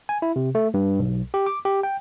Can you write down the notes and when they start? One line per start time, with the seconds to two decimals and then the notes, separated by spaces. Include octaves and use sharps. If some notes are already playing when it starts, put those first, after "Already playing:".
0.09 G#5
0.22 E4
0.36 C3
0.55 A3
0.74 G2
0.99 B1
1.34 G4
1.46 D6
1.65 G4
1.83 G5